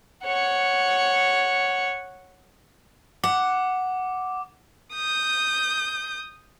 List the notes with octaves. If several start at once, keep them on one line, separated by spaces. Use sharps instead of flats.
C#5 F#5
F#5 D6
D#6 G6